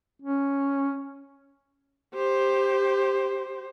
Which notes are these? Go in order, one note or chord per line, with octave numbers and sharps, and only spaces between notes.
C#4
G4 C5